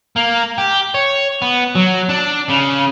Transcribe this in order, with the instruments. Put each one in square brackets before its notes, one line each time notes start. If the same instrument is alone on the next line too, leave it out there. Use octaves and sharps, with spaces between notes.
[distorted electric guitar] A#3
G4
C#5
B3
F#3
D4
C#3